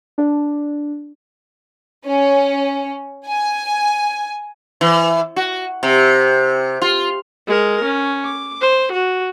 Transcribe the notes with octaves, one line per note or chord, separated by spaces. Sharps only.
D4
C#4
G#5
E3
F#4
C3
F4
G#3 A#4
C#4
D6
C5
F#4